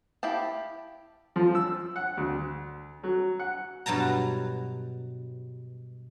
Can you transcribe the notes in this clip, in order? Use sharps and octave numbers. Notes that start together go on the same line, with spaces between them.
E4 G4 F5 A5
F3
E6
F#5
D2
F#3
F#5
G2 B2 F#3 A5 A#5